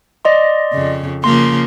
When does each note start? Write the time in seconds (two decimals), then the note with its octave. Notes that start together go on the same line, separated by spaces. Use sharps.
0.25 D5 D#5 C6
0.73 F2 C#3
1.24 C#3 F3 A#3 C6